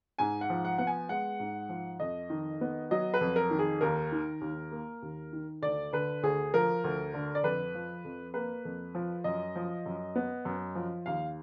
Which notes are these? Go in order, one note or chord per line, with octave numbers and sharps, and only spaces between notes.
G#2 G#5
F#5
F3
F#5
B3 F#5
G#5
G#3 F#5
G#2
F3
F2 D#5
D#3
B3
F#3 D#5
B4
F2
A#4
D#3
G#4
D#2 A#4
D#3
D#2
A#3
D#2
D#3
D2 D5
D3 B4
D2 G#4
F3 A#4
D2
D3
D5
F2 B4
F3
F2
A#3 B4
F2
F3
F#2 D#5
F3
F#2
B3
F#2
F3
D#2 F5